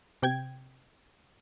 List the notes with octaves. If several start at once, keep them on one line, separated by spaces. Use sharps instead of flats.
C3 G5 G#6